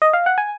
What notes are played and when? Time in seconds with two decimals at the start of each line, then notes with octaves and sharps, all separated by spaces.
0.02 D#5
0.13 F5
0.26 F#5
0.38 G#5